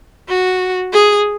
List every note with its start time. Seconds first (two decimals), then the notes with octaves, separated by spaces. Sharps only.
0.29 F#4
0.93 G#4